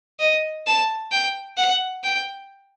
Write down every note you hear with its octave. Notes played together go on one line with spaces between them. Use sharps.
D#5
A5
G5
F#5
G5